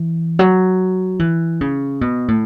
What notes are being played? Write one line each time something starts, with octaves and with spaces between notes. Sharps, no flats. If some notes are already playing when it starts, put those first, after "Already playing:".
Already playing: E3
F#3
E3
C#3
B2
A2